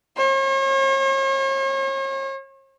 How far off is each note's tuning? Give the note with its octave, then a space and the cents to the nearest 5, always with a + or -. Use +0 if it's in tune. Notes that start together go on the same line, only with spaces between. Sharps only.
C#5 -45